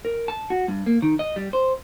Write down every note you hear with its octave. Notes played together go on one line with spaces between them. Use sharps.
A#4
A5
F#4
G2
A#3
D#3
D#5
G3
C5